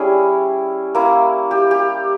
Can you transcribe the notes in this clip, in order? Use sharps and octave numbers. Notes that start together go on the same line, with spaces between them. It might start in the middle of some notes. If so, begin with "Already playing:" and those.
Already playing: G3 C#4 E4 G#4
A#3 E4
G4
G4